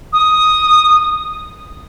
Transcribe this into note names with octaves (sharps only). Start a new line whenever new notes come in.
D#6